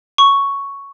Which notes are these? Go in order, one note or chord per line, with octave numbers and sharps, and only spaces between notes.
C#6